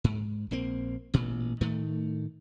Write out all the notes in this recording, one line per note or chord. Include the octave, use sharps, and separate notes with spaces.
G#2
A#1 A#3 C4
A1 A#2
A2 D#3 A3